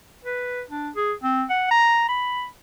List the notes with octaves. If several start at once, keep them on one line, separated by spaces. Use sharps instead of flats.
B4
D4
G#4
C4
F#5
A#5
B5